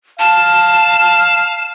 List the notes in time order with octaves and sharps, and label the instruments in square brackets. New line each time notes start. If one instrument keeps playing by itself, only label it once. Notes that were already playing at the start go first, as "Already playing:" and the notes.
[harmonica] F5 [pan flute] A5 [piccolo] E7